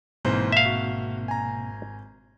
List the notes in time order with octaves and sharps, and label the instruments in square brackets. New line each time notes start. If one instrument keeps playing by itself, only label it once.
[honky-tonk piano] G#1 [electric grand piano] G#2 E3 C5 [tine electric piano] B2 A#3 C4
[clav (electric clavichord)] E5 F5
[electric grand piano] F#4
G#5 A#5